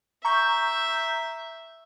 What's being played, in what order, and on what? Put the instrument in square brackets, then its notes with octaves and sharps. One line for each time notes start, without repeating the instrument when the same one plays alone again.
[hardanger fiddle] E5 [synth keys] A#5 C#6 G6